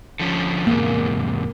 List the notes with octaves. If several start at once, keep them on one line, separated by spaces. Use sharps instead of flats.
D3 F3 C#4
E2 G#2 C3 A#3